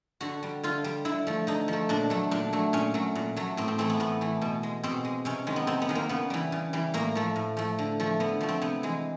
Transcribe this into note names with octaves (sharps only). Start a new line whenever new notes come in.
D3 F#4
G3
D3 F4
G3
D3 E4
F3 A3
D3 D#4
F3
A3
A#2 D4
F#3 A3
A#2 D4
F#3 A3
A#2 C#4
F#3 A3
A#2
F#3 A3
A2 C4
C4
E3 A3 C4
B3
A2 B3
E3 A3
B2
G#3
B2 C4
G#3
C3 C#4
D#3 G#3
B3
C3 C4
B3
D#3 G#3
A#3
C#3 B3
E3 G3
C#3
E3 G3
A2 A#3
F3 A3
A2
F3 A3
D3
F3 A3
D3 B3
F3 A3
C4
C3 B3
E3 G#3